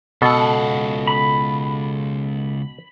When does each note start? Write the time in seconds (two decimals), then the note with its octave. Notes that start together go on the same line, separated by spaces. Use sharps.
0.22 C#2 B2 A4 F#5
1.07 B5